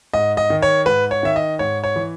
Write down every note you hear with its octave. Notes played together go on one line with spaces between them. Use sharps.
G#2 D#5
D#5
D#3
C#5
G#2 B4
C#5
D#3 E5
D#5
G#2 C#5
C#5
E3